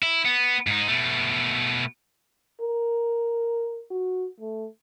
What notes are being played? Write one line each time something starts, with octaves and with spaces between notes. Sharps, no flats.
E4
B3
G#2 D#4
B2 A3
A#4
F#4
A3